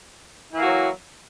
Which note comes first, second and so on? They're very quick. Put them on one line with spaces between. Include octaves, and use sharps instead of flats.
E4 E3 A#3 F#4 F#3